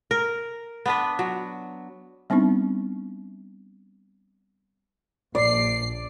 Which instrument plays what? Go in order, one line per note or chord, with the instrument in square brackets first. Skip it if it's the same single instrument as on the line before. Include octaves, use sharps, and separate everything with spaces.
[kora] A#4
B3 D4 B4
F#3
[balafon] G3 B3 C4 D4 D#4
[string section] A#1 C7 [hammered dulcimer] D5